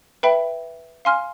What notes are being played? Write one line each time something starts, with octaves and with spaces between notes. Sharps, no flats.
B4 E5 G5 B5
F5 G#5 C6 F6